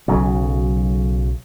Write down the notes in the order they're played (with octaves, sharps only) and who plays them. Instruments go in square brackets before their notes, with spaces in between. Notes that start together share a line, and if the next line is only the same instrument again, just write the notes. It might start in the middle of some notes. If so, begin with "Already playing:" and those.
[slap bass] B1 C#3 F#3